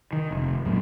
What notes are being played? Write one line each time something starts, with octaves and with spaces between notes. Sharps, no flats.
D#3
F1
C#2 A#2 F#3 A#3